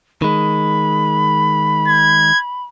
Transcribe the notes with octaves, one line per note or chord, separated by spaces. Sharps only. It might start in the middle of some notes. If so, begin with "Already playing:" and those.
D#3 G#3 B5
G#6